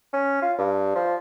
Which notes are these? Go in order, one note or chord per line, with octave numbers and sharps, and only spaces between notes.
C#4
F4
G2
F3